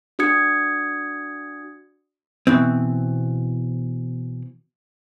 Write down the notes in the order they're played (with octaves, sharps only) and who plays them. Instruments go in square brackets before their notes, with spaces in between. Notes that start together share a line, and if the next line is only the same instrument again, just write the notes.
[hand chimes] D4 F#4 D#6 G#6 C#7
[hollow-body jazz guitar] B2 E3 C4